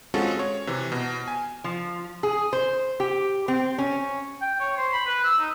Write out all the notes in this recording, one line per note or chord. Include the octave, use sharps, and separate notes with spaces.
G#3 C4 C#4 F4 F#4 A4
C#5
C3 E3
B2
G#5
F3
G#4
C5
G4
C4
C#4
G5
C#5
C5
B5
B4
E6
D#4